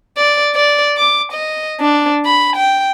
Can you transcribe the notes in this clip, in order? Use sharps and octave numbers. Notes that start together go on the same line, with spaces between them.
D5
D5
D6
D#5
D4
B5
G5